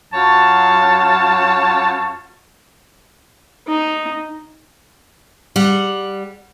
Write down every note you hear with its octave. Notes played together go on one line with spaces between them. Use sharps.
F#2 F#3 F4 C#5 F5 A5
D#4
G3 F#5